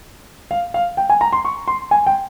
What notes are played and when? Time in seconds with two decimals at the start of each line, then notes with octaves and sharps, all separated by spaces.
0.51 F5
0.74 F5
0.97 G5
1.10 G#5
1.21 A#5
1.33 C6
1.45 C#6
1.68 C6
1.91 G#5
2.07 G5